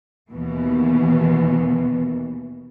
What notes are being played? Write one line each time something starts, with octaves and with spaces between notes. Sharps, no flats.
D#2 B2 E3